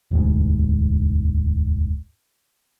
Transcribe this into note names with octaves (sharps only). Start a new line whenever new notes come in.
E1 D2 G#2